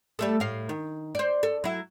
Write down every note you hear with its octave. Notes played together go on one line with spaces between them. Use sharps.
G3 A3 A4
A2 F5
D#3
C5 D5
A4
F#3 E4